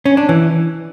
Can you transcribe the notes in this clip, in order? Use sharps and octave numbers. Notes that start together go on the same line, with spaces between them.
C#4
D4
E3